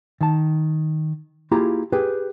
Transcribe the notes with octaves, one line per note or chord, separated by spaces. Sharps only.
D#3 A5
A#3 E4 F4 G4 G#4 A#5
G4 G#4 B4 G5